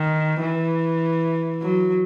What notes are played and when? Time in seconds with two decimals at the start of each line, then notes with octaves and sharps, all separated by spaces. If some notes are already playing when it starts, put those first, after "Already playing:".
Already playing: D#3
0.41 E3
1.62 F#3